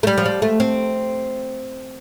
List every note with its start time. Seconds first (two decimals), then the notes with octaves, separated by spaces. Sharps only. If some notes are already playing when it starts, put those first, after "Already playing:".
0.03 A3
0.07 G3
0.18 F3
0.26 G3
0.42 A3
0.60 C4